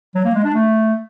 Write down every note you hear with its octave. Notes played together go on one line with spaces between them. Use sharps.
F#3
A#3
G#3
D4
A3